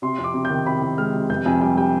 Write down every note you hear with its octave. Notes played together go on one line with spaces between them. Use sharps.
C3 C6
F2
D6
C3
G6
D#3
C3 B5
D#3
G#3 F6
C3
F1 G6
F2 G#5
G3 G5
G3 G5